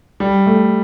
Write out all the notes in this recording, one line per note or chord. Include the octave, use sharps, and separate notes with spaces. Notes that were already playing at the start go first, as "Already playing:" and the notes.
G3
A3